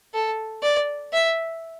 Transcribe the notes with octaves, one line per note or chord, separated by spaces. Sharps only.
A4
D5
E5